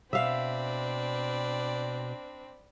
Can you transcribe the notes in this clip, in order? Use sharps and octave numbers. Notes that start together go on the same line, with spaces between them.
B2 C4 D4 D5 E5 F5 B5